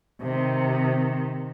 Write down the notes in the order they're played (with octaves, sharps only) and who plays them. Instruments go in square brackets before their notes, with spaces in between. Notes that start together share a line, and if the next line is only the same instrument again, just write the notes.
[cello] C3 D#3